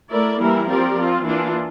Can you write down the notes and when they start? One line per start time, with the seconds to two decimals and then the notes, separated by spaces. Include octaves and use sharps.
0.10 A3 E4 A#4 D5
0.38 E3 G3 A#3 E4 A#4
0.67 F3 C4 G4 A#4 D5
0.95 F3 C4 F4
1.23 E3 A#3 D4 F4